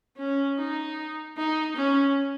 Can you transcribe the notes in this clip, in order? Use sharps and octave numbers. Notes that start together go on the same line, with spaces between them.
C#4
D#4
D#4
C#4